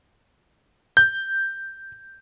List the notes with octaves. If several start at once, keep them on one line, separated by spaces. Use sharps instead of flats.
G6